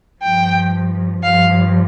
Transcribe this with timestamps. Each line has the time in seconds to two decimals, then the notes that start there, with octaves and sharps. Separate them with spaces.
0.22 G2 F3 G5
1.23 G2 F3 F5